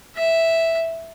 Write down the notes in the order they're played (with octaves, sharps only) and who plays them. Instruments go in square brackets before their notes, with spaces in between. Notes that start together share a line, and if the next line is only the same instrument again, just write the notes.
[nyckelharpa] E5